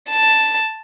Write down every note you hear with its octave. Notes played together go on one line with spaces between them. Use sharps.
A5